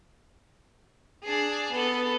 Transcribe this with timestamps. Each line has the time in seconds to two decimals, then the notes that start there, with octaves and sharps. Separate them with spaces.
1.24 D4 G#4
1.72 B3 A4